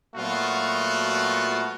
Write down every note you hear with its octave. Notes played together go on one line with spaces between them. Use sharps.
A#2 F#3 A3 B3 F4 F#4